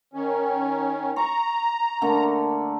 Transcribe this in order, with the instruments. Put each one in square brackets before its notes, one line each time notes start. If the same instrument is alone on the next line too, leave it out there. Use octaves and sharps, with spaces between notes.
[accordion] D#3 C#4
[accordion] A#5 [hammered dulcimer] C#6
[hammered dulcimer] D3 A3 A#3